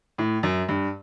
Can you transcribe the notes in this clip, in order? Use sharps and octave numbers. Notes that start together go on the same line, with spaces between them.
A2
F#2
G2